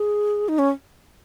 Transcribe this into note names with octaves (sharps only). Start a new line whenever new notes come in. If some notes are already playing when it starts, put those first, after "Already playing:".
Already playing: G#4
D#4
C#4